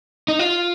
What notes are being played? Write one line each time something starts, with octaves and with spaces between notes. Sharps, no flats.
D#4
F4